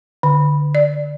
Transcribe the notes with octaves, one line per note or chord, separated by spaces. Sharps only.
D3
D5